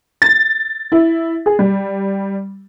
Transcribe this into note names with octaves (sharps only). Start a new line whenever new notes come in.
A6
E4
G#4
G3